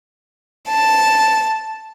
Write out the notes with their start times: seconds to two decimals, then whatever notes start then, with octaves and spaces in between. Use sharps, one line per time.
0.67 A5